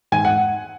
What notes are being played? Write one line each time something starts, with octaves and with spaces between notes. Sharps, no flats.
G#2 G#5
F#5